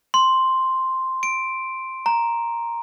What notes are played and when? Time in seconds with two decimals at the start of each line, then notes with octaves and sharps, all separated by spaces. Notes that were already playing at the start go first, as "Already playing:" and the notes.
0.14 C6
1.23 D7
2.06 A#5